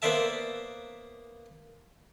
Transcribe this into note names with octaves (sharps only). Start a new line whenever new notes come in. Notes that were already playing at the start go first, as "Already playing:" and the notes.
A#3 B3 C5 D5 E5 A5